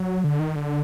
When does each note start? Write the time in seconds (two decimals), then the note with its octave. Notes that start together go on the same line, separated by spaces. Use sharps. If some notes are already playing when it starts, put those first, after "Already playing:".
Already playing: F#3
0.24 D3
0.40 D#3
0.56 D3